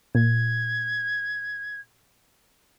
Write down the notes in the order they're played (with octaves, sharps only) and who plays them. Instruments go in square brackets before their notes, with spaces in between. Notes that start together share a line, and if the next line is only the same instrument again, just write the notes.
[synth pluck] A#2 [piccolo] G#6